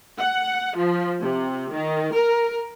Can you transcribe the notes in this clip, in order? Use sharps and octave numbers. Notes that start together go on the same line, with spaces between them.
F#5
F3
C3
D#3
A#4